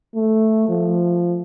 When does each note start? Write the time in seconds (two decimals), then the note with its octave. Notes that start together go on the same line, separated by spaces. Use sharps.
0.15 A3
0.69 F3